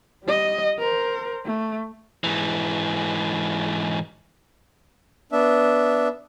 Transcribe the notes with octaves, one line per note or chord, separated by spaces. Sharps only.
G3 D#5
A#4 C5
A3
G#2 E3
B3 D4 E5